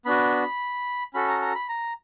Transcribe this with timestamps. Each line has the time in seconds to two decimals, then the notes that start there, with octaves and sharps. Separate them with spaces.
0.05 B3 D4 F#4 B5
1.14 C#4 F#4 A4 B5
1.28 A#5
1.42 A#5
1.55 B5
1.69 A#5